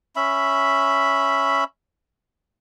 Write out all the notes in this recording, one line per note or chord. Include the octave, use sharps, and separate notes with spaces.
C#4 E5 B5